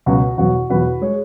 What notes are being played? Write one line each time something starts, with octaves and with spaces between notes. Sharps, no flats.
C#2 B2 F#3 F#4
E2 B2 F#3 F#4
E2 B2 F#3 F#4 B4
G#3 G#4 C#5